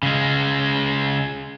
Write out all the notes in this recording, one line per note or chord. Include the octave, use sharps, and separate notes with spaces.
C#3 G#3